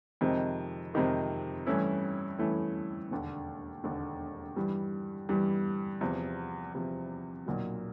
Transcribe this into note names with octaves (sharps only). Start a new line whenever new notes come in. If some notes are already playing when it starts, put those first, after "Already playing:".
F2 C3 D#3 G#3
F2 C3 D#3 G#3
G2 E3 A3 C#4 E4
G2 E3 A3 C#4 E4
E1 D#2 D3
E1 D#2 D3
G2 E3 G3
G2 E3 G3
E2 C3 F3
E2 C3 F3
B1 A#2 F#3